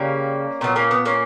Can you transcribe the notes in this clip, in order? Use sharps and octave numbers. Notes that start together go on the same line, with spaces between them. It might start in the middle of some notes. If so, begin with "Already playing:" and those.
Already playing: C#3 G3 A#3 C#4
A#2 F#3 B3
A#3 C#4
B3
A#3 C#4